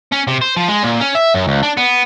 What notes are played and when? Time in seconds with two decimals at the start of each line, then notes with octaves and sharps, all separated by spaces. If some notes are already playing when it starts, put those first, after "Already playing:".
0.12 C#4
0.28 C3
0.42 C5
0.56 F3
0.69 G#3
0.83 A#2
1.01 C#4
1.15 E5
1.34 F#2
1.48 C#2
1.63 D4
1.77 B3